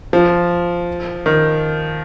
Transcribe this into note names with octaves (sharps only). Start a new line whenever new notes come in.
F3
D#3